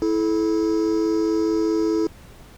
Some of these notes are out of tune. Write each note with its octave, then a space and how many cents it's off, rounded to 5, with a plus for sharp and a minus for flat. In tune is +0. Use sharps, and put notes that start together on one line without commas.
E4 -10 A4 -30